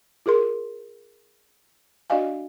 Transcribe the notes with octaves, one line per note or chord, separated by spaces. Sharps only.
F4 G#4 A#4 C6
D4 F#4 D5 D#5 F5 G#5